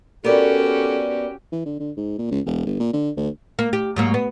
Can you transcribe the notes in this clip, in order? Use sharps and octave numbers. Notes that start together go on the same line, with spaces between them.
B3 C#4 F#4 G4 A4 A#4 D5
E3
D3
D3
G#2
A#2
C#2
E1
G1
A#2
D3
D2
A#3
G4
G#2 F#3 A#3
B3